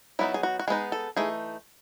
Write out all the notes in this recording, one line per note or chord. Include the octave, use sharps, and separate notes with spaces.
F#3 B3 D#4 E4
G#4
F#4
F#4
G#3 B3 D#4 G#4
A4
E3 A3 D#4 G#4